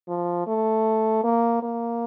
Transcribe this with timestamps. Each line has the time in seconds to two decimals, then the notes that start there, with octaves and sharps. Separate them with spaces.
0.08 F3
0.47 A3
1.24 A#3
1.63 A#3